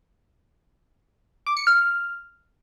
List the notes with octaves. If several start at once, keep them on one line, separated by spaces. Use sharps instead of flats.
D6
C#7
F6